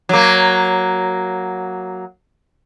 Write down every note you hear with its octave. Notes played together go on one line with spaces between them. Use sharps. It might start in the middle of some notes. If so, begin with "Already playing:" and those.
F#3 A#3